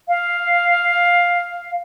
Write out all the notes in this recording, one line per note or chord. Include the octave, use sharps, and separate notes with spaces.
F5